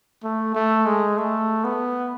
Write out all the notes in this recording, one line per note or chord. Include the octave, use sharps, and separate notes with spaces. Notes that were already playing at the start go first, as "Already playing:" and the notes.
A3
A3
G#3
A3
B3